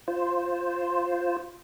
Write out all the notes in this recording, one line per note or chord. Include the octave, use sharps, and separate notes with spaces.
F4 C5